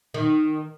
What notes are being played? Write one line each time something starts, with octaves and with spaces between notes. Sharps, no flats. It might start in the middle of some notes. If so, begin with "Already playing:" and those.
D#3